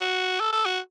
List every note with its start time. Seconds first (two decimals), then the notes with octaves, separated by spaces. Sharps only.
0.01 F#4
0.40 A4
0.53 A4
0.66 F#4